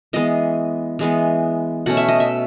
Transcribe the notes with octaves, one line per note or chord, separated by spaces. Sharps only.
E3 G#3 B3 D#5
E3 G#3 B3
B2 A3 C#4 F#5
E5
D#5
E5